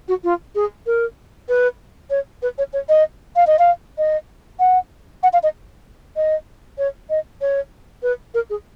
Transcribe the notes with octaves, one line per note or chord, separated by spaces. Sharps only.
F#4
F4
G#4
A#4
B4
C#5
B4
C#5
C#5
D#5
F5
D#5
F5
D#5
F#5
F#5
F5
D#5
D#5
C#5
D#5
C#5
B4
A#4
G#4